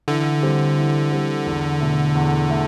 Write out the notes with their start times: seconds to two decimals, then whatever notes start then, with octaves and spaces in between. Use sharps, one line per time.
0.08 D3 E3
0.43 G3 C4 G4
0.77 E3
1.11 G3 C4 G4
1.46 E2
1.81 B2 A3
2.15 E2
2.50 A3